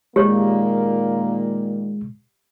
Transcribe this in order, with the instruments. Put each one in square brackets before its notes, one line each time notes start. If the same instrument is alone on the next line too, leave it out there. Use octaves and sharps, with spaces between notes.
[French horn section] A#2 D#3 A#3 [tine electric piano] G#3 [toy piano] G4 C#5